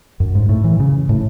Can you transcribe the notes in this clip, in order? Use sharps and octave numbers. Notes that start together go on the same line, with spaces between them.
F#2
G#2
A2
E3
C#3
A2